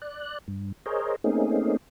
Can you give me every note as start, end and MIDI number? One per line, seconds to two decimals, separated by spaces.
0.02 0.38 74
0.02 0.38 90
0.48 0.72 43
0.86 1.16 68
0.86 1.16 70
0.86 1.16 72
0.86 1.16 73
0.86 1.16 75
1.24 1.77 57
1.24 1.77 58
1.24 1.77 60
1.24 1.77 61
1.24 1.77 63
1.24 1.77 68